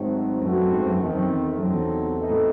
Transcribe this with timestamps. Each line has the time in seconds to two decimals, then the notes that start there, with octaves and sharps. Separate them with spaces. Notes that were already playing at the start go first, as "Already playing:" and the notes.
Already playing: G#2 D#3 F#3 A3 C4
0.42 F#2 E3 A3 C4 F#4
0.56 F#2
0.71 G#2
0.86 F#2
1.00 E2 D#3 A3 C4
1.13 F#2
1.27 E2
1.59 F#2 C3 F#3 C4 D#4 A4
1.73 E2
2.17 E3 C4 D#4 F#4 A4
2.30 A2